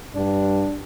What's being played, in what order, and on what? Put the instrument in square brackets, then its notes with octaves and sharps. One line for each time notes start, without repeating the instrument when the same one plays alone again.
[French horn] G2 [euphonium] D4